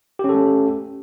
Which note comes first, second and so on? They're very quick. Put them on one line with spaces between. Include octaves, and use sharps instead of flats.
G4 C#4 A4 A3